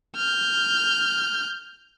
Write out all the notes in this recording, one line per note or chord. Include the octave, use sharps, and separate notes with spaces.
F6 G6